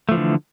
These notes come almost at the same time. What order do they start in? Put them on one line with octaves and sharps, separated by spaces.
A3 F3 E3 D3